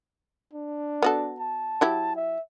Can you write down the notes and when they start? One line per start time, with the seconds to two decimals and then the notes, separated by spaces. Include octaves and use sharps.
0.53 D4
1.02 B3 F#4 A4
1.40 A5
1.81 F#3 E4 G4
2.16 E5